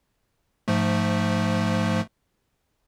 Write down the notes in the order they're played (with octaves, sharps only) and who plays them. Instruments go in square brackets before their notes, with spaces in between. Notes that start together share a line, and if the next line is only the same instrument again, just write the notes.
[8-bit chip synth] G#2 F3 A3